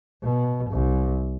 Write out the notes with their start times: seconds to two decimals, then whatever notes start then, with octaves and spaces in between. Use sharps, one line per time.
0.23 B2
0.70 C2